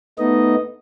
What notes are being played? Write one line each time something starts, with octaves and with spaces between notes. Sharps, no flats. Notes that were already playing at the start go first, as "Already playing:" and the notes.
A3 B3 D#4 D#5